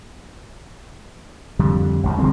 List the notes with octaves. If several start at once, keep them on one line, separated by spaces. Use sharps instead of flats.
F2 D3 G3
G#1 C#2 G#2
D3 G3 G#3 C4